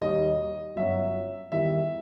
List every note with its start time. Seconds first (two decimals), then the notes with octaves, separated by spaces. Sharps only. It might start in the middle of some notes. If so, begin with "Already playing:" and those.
0.01 D#2 D#3 G3 D#5
0.76 G1 F#2 F#3 E5
1.52 E2 D#3 G3 E5